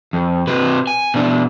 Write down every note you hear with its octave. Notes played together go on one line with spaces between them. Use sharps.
F2
C3 B4
G#5
B2 D4